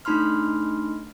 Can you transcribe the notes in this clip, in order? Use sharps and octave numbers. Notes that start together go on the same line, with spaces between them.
A3 D4 D#4 B5 C6 F6